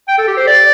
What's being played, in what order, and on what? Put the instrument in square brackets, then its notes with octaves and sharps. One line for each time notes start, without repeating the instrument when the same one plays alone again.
[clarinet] G5
A4
G4
C5
D5